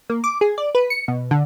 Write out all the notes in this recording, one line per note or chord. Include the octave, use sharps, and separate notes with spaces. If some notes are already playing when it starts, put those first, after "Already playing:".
A#3
D6
G#4
D5
B4
C#7
B2
D3